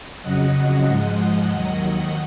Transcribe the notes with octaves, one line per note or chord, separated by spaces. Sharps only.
F2 C#3 F#3 D#5 F#5
G#2 F3 G#3
D#2 D#3 F#3 D#5 F#5